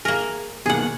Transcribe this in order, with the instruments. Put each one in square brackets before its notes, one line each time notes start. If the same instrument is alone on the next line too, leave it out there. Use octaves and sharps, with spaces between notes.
[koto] A#3 A#4 [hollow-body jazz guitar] G#4
[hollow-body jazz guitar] B2 D#3 A#3 [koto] G#4 F#5